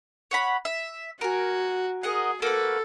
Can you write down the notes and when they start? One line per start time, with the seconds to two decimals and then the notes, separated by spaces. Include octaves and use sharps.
0.31 C#5 F#5 B5
0.65 E5
1.21 F#4 A#4 G#5
2.03 G#4 A#4 D#5 F#5
2.42 A#3 F#4 A4 B4